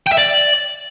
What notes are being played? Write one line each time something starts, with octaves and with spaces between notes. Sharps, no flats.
G5
E5
D5